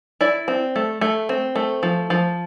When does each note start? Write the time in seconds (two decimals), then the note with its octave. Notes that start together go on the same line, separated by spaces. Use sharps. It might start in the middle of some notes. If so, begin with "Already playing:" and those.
0.21 E4 D5
0.48 C4
0.76 A3
1.01 A3
1.29 C4
1.56 A3
1.83 F3
2.10 F3